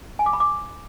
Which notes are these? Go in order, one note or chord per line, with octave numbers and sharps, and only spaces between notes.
G#5
D6
B5
D6